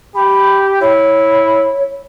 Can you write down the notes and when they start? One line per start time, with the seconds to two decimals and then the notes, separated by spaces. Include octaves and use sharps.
0.15 G4 B5
0.81 E4 C#5